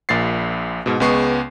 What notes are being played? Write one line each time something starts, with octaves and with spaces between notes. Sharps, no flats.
A#1 A#2 A6 C7
G#2 B2
C#2 G#3 B3 C#6 C7